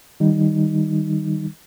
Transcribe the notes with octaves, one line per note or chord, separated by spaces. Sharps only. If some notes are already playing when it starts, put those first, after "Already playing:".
D#3 G3 D#4